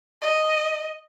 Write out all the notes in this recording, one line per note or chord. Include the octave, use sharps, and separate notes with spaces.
D#5